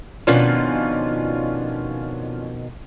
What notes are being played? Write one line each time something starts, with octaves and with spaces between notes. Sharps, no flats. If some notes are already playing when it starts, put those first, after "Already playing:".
F2 B2 D#3 C#4 D4 F4